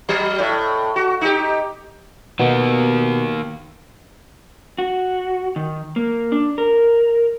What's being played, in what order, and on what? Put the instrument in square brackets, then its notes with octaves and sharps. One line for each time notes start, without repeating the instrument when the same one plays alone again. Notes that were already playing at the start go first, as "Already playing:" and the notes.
[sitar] F#3
A2
F#4
D#4 G4
[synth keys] B2 [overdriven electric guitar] D#3 A#3
[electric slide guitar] F#4
D#3
A#3
D4
A#4